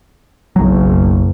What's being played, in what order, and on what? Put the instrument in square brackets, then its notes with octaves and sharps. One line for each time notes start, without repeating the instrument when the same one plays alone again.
[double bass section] F#1 [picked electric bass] B1 F#3